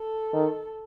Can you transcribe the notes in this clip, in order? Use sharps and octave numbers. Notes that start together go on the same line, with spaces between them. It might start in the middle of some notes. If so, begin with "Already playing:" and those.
Already playing: A4
D#3